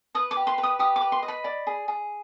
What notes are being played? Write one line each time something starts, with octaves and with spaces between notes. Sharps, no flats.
B4 D#6
D6
G4
C6
B4
D#6
G4 D#6
D6
B4
C6
D#5
B5
D5
G#4
G#4